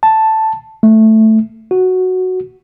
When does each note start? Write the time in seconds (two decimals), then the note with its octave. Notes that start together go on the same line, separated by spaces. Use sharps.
0.03 A5
0.83 A3
1.71 F#4